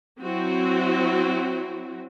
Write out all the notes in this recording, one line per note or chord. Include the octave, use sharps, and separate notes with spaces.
F#3 C4 E4 F#4